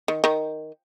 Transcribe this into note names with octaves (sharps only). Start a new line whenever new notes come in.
D#3
D#3